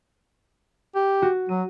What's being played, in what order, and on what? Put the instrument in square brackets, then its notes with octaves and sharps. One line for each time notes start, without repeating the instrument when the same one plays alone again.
[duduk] G4
[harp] F#4
[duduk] F#3 [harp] D#7